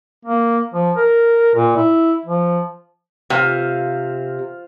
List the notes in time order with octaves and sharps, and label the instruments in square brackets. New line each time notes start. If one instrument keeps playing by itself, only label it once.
[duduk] A#3
F3
A#4
A#2
E4
F3
[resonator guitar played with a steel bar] C3 [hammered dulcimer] F4 C5 F5